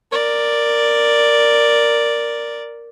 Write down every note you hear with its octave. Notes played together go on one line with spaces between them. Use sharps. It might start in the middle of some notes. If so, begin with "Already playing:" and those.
A#4 D5